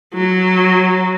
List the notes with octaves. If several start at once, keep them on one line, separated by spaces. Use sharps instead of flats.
F#3